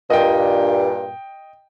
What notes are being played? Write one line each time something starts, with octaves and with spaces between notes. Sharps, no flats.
G2 A#2 D#5 G5